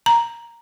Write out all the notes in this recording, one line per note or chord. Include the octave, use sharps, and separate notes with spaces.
A#5